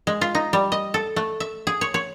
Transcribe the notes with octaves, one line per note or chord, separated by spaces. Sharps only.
G#3
F4
D#4
G3
D#5
A4
A3
E5
G#4
C#5
C#5